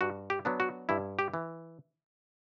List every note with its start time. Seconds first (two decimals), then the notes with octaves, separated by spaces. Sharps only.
0.01 G2 F#4
0.30 G4
0.45 F#3 B3 D4
0.60 F#4
0.89 G2 E4
1.19 G4
1.34 E3